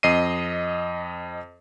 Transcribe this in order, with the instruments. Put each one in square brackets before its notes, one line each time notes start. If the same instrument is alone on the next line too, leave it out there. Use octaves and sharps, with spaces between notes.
[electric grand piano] F2 D#5 C7 D#7